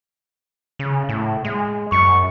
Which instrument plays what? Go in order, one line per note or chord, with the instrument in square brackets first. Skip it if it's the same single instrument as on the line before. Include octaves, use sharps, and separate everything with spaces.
[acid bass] C#3
A2
G#3
[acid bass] F#2 [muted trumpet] C#6